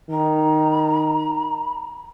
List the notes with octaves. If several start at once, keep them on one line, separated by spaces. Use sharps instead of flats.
D#3 A#5